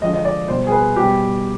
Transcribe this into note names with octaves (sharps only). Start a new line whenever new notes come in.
D3 F3 G#3 D#5
D#5
D5
B2 G3 C5
G#4
B4
B2 G3 G4